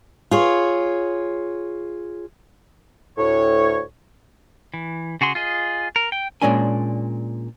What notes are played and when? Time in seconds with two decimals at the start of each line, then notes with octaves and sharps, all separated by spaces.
0.31 F4 G#4 C#5
3.18 D2 A2 C#5
4.74 E3
5.21 C#3 F#4 G#4 C6
5.35 F4 G#4 D#5
5.96 A#4
6.12 G5
6.42 A#2 G#3 C#4 D4 G#5